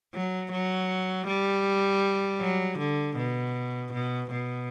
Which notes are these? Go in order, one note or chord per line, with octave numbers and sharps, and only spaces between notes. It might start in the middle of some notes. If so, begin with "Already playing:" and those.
F#3
F#3
G3
F#3
D3
B2
B2
B2